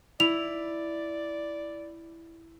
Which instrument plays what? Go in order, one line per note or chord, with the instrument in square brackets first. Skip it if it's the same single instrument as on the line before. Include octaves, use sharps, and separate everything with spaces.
[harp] E4 [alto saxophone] D5 [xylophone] F7